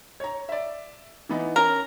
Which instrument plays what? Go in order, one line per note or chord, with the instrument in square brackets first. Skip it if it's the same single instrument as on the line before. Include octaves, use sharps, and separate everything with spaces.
[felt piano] C#5 A#5
D5 E5
E3 B3 D#4
[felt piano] C#4 [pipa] A#4